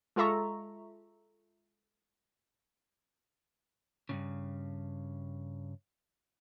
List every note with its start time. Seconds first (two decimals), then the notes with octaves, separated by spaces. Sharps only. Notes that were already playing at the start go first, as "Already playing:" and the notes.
0.16 G#3 F4 A4 E5 A#5 C#6
4.09 G2 A#2 C#3